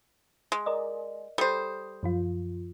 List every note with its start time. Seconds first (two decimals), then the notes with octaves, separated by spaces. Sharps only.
0.52 G#3
0.66 A#4 D5 D#5
1.38 G3 A4 C5 D#6
2.03 F#2 F3 F4